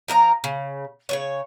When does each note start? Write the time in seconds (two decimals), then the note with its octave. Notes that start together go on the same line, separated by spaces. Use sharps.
0.08 F3 A#4 D#5 A#5
0.44 C#3
1.09 C#3 F3 C#5